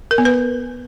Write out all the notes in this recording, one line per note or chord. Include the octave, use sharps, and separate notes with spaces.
A#4
B3
B4